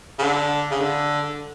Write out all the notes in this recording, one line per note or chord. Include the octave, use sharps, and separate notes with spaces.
C#3
D3
C#3
D3